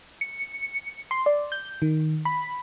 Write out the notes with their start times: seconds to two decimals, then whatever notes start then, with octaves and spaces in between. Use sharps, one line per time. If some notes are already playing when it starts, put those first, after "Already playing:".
0.21 C#7
1.11 C6
1.26 D5
1.52 G6
1.82 D#3
2.25 B5